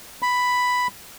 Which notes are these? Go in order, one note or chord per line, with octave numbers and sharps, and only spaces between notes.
B5